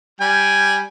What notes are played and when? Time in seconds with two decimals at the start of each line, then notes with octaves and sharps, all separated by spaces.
0.20 G3 G#5